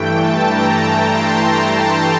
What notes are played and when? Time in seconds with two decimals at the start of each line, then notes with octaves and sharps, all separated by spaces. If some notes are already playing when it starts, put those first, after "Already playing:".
Already playing: G2 E3 A3 G5
0.15 A5
0.47 A#5
1.10 C6
1.42 A#5
1.74 A5